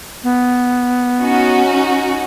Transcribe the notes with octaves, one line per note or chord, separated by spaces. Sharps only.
B3
C#4 D#4 F#4